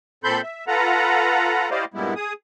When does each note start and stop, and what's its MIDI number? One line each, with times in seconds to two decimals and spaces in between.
0.24 0.41 46
0.24 0.41 60
0.24 0.41 69
0.24 0.41 83
0.24 0.41 84
0.24 0.41 91
0.43 0.65 76
0.68 1.70 65
0.68 1.70 69
0.68 1.70 71
0.68 1.70 78
0.68 1.70 82
1.71 1.85 64
1.71 1.85 67
1.71 1.85 72
1.71 1.85 74
1.71 1.85 75
1.71 1.85 77
1.94 2.14 43
1.94 2.14 46
1.94 2.14 55
1.94 2.14 56
1.94 2.14 59
1.94 2.14 64
2.16 2.33 68
2.16 2.33 87